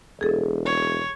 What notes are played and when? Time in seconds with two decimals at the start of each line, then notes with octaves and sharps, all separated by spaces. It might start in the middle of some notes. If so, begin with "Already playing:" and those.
0.21 E1 G#4 A4
0.65 C#5